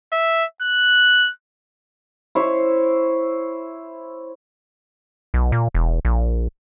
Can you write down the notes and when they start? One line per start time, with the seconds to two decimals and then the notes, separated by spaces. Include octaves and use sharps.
0.12 E5
0.62 F#6
2.35 E4 C5 C#5
5.34 B1
5.52 A#2
5.75 E1
6.05 A#1